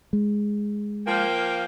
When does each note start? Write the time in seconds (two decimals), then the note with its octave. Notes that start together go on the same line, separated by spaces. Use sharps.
0.13 G#3
1.07 F3 A#3 G5